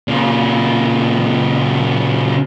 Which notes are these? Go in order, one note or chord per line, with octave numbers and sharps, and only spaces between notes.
A#2 C#3